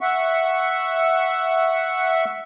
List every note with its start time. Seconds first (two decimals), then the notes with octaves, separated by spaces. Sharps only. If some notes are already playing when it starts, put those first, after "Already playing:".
0.01 E5 F#5 C#6